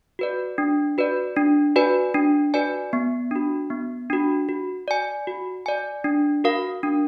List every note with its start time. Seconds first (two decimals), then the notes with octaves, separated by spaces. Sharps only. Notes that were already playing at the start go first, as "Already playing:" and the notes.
0.19 F#4 B4 D5
0.58 D4
0.98 F#4 B4 D5
1.36 D4
1.76 F#4 B4 D5 G#5
2.14 D4
2.54 F#4 B4 D5 G#5
2.93 B3
3.31 D4 F#4
3.70 B3
4.10 D4 F#4
4.49 F#4
4.88 D5 G#5
5.27 F#4
5.66 D5 G#5
6.04 D4
6.44 F#4 A#4 F5
6.83 D4